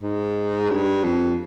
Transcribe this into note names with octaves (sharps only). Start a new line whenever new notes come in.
G#2
G2
F2